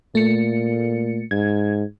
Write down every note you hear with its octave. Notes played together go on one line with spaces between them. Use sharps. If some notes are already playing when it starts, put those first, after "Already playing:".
A#2 A3 C#7
G#2 G#6